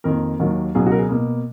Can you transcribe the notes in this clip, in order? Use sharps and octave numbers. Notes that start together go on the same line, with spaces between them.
F2 D#3 A#3 A#4
D#2 D#3 F#3 A#3
C#2 B2 F#3 G#4
F#4
A#4
G#4
B2 A#3